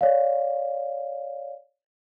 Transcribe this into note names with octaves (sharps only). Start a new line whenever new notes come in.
C#5 D5 F5